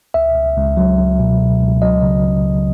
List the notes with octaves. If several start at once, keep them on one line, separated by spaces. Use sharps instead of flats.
C#2 E5
C#2
C#2
F#3
C#2
B2
B2
C#2
F#3 D#5
C#3
C#3
C#2